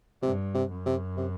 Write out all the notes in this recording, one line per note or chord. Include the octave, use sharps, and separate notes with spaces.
G2 C3
C3
F#2
C3
C3